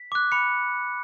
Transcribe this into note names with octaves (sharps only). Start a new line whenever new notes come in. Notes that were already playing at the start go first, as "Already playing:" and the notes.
Already playing: B6
D6 F#6
B5 C#7